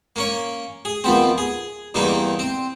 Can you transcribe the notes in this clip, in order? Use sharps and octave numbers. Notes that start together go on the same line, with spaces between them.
A#3 C#4 C#5
G#4
D#2 F3 B3 C4
G#4
E2 G2 C3 E3 A#3 D#4
C4